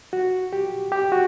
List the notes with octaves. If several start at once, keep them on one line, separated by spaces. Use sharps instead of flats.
F#4
G4
G4
F#4